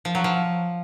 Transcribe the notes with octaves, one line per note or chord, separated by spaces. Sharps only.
F3
F#3
F3